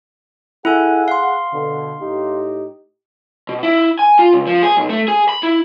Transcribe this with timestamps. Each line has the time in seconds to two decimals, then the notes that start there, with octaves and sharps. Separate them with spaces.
0.65 E4 G#4 A4 F#5 G#5
1.08 F5 C6
1.53 B2 D3
2.01 A2 D#4 G4
3.49 B2
3.63 E4
3.99 G#5
4.19 F4
4.33 C#2
4.47 F3
4.63 G#4
4.77 B1
4.90 A3
5.08 G#4
5.29 B5
5.43 E4